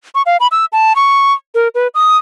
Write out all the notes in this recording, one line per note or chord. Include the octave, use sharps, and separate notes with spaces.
C#6
F5
B5
E6
A5
C#6
A#4
B4
D#6